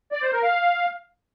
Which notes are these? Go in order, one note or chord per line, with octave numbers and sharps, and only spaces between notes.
D5
C5
A#4
F5